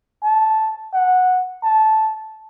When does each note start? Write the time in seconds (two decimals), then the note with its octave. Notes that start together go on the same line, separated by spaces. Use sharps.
0.24 A5
0.94 F#5
1.63 A5